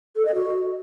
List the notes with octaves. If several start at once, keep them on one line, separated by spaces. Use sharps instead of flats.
A4
D#5
F#4